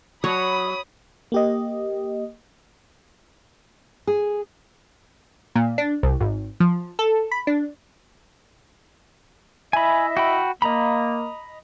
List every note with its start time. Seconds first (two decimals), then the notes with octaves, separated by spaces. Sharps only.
0.24 F#3 C#5 B5 D#6
1.32 A#3 G4 D#5
4.07 G#4
5.55 A#2
5.78 D4
6.03 C2
6.21 G#1
6.60 F3
6.99 A4
7.32 B5
7.47 D4
9.73 E4 D#5 E5 G#5 B5
10.17 F#4 G5 B5
10.62 A#3 D#5 A#5 B5